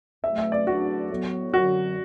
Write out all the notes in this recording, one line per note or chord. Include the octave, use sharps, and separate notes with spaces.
E2 B2 F#3 A3 E5
E5
D5
E2 D3 F#3 A3 D4 F#4
A2 F#3 B3
F#2 D3 F#3 F#4